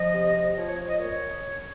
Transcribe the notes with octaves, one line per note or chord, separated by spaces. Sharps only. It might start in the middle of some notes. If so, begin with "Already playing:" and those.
Already playing: F3 D#5
C3
C3
F3 C#5
C#5
F3
D#5
A#2 C#5